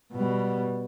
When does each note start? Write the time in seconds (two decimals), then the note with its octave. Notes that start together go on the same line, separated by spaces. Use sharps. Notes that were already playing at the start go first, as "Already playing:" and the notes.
0.12 B2 G3